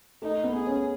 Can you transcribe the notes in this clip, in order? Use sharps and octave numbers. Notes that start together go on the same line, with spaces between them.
A3 D#4
B3
G#4
C#4